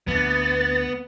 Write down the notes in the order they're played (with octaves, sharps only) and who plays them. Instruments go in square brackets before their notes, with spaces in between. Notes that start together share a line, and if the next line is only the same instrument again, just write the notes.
[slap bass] D2 [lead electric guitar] B3 [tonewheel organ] A6